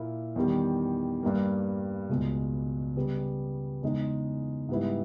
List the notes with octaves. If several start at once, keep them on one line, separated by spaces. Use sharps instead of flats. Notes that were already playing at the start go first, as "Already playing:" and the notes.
Already playing: A#2 A#3 E4
E2 D#3 G3
G2 G3 A#3
C#2 B2 G#3
C#3 G3 B3
E2 C#3 G#3 D#4
G#2 G3 B3 E4